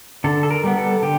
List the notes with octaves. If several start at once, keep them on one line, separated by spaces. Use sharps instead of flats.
D3 A4
A4
A#4
G3 B3
A4
D3 G4